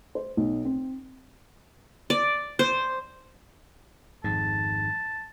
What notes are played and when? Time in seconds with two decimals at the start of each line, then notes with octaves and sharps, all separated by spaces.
0.15 C5
0.37 B1
0.65 C4
2.10 D5
2.59 C5
4.24 G#1 F2 G#2 A5